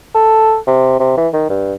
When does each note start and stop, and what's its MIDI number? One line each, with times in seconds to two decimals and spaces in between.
0.15 0.57 69
0.67 0.97 48
1.00 1.15 48
1.17 1.28 52
1.33 1.46 51
1.50 1.73 43